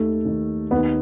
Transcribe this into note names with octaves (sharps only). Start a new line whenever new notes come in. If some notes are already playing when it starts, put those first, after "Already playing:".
Already playing: D#2 D#3 A3
D#2 D#3
D#2 D#3 B3